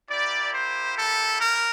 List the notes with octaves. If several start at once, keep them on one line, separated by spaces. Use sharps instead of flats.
A#3 E4 G4 D5
C5
A4
A#4